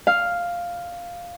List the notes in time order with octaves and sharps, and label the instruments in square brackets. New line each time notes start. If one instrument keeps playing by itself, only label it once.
[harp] F5